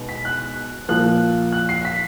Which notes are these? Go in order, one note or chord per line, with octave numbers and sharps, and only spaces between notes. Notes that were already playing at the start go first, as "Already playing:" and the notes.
Already playing: B2 G#3 B3 D#4
B6
F#6
A#2 F3 A#3 F#6
F#6
C7
B6